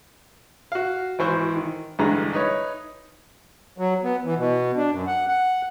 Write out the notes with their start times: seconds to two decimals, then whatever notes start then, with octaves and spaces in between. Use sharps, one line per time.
0.72 F#4 F5
1.19 G#1 E3 C5 C#6
1.56 D#3
1.99 A1 G2 D3 G#3 A#5
2.33 D#4 B4 C#5
3.78 F#3
4.04 B3
4.24 E3
4.37 B2
4.77 D4
4.91 F#2
5.07 F#5
5.28 F#5